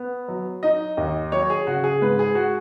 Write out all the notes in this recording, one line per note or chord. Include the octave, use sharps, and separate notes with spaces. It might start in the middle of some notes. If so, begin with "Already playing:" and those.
Already playing: B3
F#3
D#4 D#5
D#2
F#3 C#5
G#4
C#3 F#4
G#4
G#2 B4
G#4
F#4